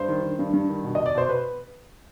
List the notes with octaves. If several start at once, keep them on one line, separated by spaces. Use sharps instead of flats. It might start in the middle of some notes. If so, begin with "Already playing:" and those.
Already playing: G2 C5
D#3
D#3
G2
G2
D#3
B2
B2 D#5
D5
B2 C5
B2 B4